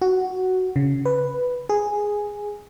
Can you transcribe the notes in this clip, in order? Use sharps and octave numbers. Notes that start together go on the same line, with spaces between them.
F#4
C#3
B4
G#4